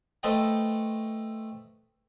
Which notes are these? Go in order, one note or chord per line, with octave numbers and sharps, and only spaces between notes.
A3 A4 B4 C5 D#5 G5